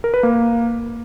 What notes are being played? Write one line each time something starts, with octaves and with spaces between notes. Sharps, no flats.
A#4
B4
A#3